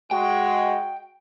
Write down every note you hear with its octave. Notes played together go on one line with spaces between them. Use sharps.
G#3 F#4 G5